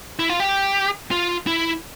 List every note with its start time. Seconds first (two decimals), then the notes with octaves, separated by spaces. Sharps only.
0.19 E4
0.30 F4
0.40 G4
1.11 F4
1.47 E4